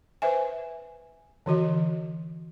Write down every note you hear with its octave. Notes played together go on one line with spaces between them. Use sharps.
B4 C5 E5 G#5
D3 E3 F#4 D#5